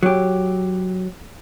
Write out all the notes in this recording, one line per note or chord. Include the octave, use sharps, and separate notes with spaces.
F#3 G4